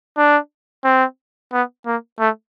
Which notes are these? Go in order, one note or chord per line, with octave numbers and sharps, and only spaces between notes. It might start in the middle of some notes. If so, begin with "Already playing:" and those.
D4
C4
B3
A#3
A3